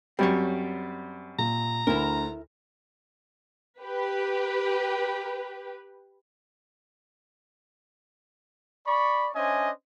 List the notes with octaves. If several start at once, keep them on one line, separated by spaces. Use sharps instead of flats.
F#2 G3 C4 C#5
A#2 A#5
D2 E4 A#4
G4 B4
D5 B5 C#6
C#4 D4 C5 D#5 E5 G#5